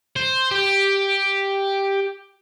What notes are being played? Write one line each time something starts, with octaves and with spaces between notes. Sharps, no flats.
C5
G4